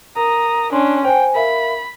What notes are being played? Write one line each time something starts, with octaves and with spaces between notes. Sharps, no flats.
A#4 A#5 D#6
C#4 D4 C6
C5 G5 G#5
A#4 E5 F5 B5